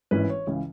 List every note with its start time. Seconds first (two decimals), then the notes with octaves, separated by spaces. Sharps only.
0.11 G#1 G#2 E3 C#4 E4 B4
0.29 C#5
0.47 C#2 C#3 E3